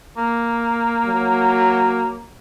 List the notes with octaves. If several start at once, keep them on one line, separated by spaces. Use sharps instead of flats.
A#3
F#3